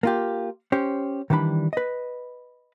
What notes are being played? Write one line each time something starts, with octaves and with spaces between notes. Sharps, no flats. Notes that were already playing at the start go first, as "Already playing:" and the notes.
A#3 F4 G4
C#4 G4 C5
D#3 E3 G3 D4 B5
B4 D#5